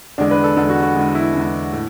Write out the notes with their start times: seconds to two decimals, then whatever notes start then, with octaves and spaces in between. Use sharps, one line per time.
0.18 E2 D3 G#3 D4
0.31 B4
0.44 A4
0.56 E2 D3 G#3 A4
0.70 F#4
0.83 F#4
0.96 E2 D3 G#3
1.15 E4
1.34 E2 D3 G#3
1.73 A2